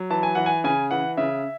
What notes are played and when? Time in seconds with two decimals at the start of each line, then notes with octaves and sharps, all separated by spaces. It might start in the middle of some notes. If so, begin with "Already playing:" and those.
Already playing: F#3
0.10 E3 A5
0.23 G#5
0.35 E3 F#5
0.46 G#5
0.64 C#3 G#5
0.91 E3 F#5
1.17 C#3 E5